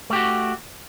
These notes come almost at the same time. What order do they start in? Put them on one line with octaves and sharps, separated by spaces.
A3 G4 F#4